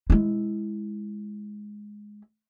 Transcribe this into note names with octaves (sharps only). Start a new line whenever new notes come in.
G#3 E4